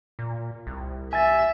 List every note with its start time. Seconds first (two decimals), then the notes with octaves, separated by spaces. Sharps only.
0.19 A#2
0.67 C2
1.13 E5 G#5 A6